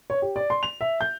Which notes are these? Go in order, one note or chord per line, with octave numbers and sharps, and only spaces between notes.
C#5
G4
D5
C6
F7
E5
G6